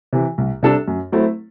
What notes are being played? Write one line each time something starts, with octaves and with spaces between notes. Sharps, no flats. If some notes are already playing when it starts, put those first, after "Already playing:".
C3 E3
C2
C3 G3 D4 A4
F#2
F#3 A3 C4 E4